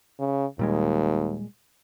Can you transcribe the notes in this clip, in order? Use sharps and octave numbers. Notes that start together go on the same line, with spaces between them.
C#3
D#2 A#2 G3 G#3